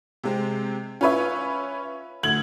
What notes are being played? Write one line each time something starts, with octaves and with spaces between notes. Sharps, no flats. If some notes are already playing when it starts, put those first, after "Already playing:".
C3 G#3 C4
C#4 F4 B4 C#5 E5
D2 G#6 F#7